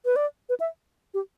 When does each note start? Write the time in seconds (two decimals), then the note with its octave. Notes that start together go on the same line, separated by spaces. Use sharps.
0.05 B4
0.16 D5
0.49 B4
0.60 E5
1.14 G4